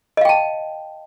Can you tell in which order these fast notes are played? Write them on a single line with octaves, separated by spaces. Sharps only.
D#5 F5 G5 A5